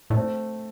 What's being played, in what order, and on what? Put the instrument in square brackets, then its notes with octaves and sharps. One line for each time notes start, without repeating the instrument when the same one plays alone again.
[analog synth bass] A2 [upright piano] D4
[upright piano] A3 C4